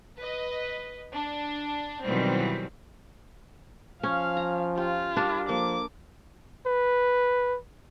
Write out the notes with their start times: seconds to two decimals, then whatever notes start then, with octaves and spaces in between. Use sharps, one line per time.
0.19 B4 D#5
1.14 D4
2.05 B2 D#3 E3 F#3 G3 C4
4.03 F3 C#4 F5
4.37 A#5
4.77 F4 G4
5.17 G3 D4 A#4
5.49 F3 A#3 A4 D6
6.67 B4